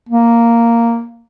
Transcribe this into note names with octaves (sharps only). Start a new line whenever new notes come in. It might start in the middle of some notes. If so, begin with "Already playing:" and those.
A#3